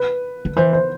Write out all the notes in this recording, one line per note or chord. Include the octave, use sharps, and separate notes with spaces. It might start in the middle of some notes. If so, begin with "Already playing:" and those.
Already playing: B4
D3
E3 C5
C5